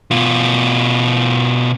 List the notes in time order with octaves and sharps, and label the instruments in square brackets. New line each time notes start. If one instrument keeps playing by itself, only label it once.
[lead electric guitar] B2 F4